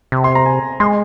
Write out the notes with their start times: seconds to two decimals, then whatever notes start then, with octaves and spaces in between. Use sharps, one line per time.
0.12 C3
0.24 C6
0.35 A#5
0.46 G#5
0.80 G#3 C6